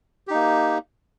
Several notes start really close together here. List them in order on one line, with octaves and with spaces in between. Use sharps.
G4 D#4 A#3